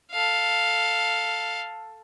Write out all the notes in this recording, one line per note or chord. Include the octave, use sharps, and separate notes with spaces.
A4 F5